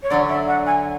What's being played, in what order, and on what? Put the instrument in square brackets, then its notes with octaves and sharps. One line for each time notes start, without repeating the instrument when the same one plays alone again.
[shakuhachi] C#5
[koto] D3 F#3 C#4 [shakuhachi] D5
[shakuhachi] E5
F#5
G#5